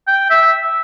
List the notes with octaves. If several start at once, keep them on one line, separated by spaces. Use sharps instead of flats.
G5
E5